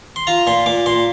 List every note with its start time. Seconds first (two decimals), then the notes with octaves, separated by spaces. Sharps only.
0.16 C6
0.27 F4 A#5
0.47 A#2 C6
0.66 A#2 D6
0.86 A#2 C6